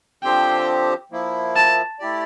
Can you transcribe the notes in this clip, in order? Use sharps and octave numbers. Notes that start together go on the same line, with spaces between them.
D3 F3 C4 G4 C5 G5
F3 A#3 E4
A5
A3 E4 G4 D5